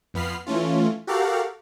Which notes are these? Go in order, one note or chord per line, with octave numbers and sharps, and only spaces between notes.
F2 B3 B5 F6 C7
E3 A3 C#4 F4
F#4 G4 A4 A#4 F5 F#5